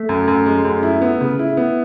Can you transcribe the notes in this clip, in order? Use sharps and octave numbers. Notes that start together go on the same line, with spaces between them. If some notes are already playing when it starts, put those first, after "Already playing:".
Already playing: A3
F#2
F#2
G#3
F#2
E4
B3
C#3
E4
B3